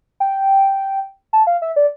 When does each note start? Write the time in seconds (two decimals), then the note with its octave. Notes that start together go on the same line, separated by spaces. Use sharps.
0.20 G5
1.33 A5
1.47 F5
1.62 E5
1.76 D5